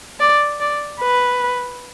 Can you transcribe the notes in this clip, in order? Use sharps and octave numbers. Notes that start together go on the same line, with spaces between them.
D5
D5
B4